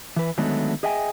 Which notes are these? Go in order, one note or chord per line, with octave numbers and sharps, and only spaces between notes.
E3 B4
D3 D#3 F#3 G#3 A3 B3
G#4 D#5 E5 G5 G#5